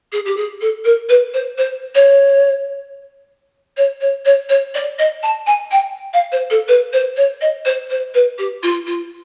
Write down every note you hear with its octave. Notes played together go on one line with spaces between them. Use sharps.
G#4
G4
G#4
A4
A#4
B4
C5
C5
C#5
C#5
C#5
C#5
C#5
D5
D#5
A5
G#5
G5
F5
C5
A4
B4
C5
C#5
D#5
C5
C5
B4
G4
F4
F4